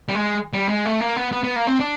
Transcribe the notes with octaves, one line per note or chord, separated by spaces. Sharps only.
G3
G#3
G3
G#3
A3
A#3
B3
B3
B3
A#3
C4
D4